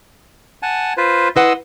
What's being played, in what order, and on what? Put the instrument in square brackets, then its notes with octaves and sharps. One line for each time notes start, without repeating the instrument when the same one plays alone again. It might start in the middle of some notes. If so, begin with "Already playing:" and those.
[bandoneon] F#5 G#5 A5
F4 B4 C5
[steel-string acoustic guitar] E4 B4 F#5 [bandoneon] D#5 C6 E6